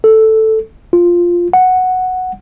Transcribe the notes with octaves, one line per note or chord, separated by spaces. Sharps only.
A4
F4
F#5